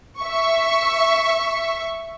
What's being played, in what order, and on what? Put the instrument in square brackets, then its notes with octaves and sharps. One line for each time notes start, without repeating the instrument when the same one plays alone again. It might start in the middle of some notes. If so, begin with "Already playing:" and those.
[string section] E5 C#6